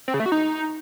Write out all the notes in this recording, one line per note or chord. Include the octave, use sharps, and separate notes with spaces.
C4
C#3
A3
F#4
D#4